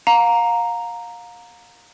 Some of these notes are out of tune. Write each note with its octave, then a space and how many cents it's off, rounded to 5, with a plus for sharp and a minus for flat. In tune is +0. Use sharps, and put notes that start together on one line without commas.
F5 +30 A#5 +0